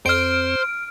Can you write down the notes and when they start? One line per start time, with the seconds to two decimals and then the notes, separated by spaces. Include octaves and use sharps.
0.06 F2 C5 F6 D7